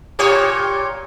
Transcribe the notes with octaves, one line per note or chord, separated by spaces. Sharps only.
A#2 G4 C#5